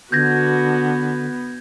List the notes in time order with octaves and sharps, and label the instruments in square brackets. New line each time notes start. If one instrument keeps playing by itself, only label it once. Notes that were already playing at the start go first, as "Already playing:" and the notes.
[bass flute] D3 [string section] B3 [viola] F#4 [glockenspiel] G6 G#6 A#6